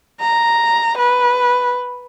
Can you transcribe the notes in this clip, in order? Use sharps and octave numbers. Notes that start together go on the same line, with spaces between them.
A#5
B4